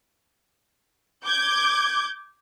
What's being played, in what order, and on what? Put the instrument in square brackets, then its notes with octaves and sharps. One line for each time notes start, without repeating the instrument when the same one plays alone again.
[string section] D6 G6 G#6